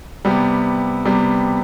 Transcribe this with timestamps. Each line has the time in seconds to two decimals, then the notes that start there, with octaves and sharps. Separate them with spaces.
0.25 C3 G3 B3
1.05 C3 G3 B3